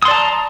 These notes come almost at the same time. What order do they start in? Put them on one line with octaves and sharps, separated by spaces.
D#6 C6 D5 A5 A#5